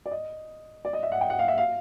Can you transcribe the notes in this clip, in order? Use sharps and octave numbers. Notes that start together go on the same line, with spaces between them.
D5
D#5
D5
D#5
E5
F#5
G5
F#5
F5
E5
F5